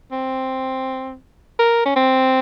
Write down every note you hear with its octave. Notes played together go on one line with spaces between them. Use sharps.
C4
A#4
C#4
C4